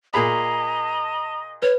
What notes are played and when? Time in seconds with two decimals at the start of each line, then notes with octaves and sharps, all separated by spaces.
0.14 A#2 G#4 D#5 A#5 B5
1.62 B4 C#5